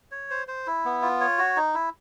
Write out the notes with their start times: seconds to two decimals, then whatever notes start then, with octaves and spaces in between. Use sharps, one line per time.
0.11 C#5
0.30 C5
0.48 C5
0.67 E4
0.85 B3
1.02 F4
1.21 C#5
1.38 F#4
1.56 D#4
1.74 E4